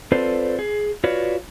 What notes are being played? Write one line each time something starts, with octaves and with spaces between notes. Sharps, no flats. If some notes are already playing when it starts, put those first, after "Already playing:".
C4 F4 A4 B4 C5 D5
G#4
F4 F#4 B4 C#5 D5